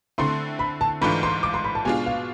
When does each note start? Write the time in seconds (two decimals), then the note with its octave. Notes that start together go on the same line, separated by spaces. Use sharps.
0.18 D3 A3 C4 E4 C6
0.59 B5
0.81 A5
1.01 G#2 E3 A3 D4 F4 B5
1.23 C6
1.43 D6
1.54 C6
1.64 B5
1.75 A5
1.85 B2 G#3 D4 F4 G#5
2.06 F5